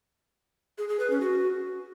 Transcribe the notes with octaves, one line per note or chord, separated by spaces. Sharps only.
G#4
G#4
B4
C#4
F#4